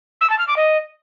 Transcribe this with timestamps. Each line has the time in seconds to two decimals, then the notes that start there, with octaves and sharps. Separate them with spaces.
0.21 E6
0.30 A5
0.39 F6
0.48 D6
0.57 D#5